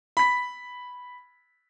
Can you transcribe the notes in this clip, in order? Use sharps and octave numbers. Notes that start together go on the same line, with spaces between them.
B5 B6